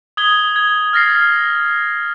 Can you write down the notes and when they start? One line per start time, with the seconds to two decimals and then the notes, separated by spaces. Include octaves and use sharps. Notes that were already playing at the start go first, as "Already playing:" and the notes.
0.17 D#6 G#6 G7
0.56 G#6
0.93 F6 A6 A#6 C7